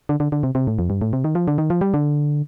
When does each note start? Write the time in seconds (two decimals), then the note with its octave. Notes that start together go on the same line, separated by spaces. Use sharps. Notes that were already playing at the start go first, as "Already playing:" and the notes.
0.09 D3
0.20 D3
0.32 D3
0.43 C3
0.55 C3
0.67 A2
0.79 F2
0.90 G2
1.02 A2
1.13 C3
1.24 D#3
1.35 F3
1.48 D3
1.58 D#3
1.70 F3
1.81 G3
1.94 D3